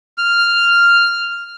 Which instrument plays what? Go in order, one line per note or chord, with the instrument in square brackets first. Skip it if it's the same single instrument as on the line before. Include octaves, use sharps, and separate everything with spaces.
[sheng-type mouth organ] F6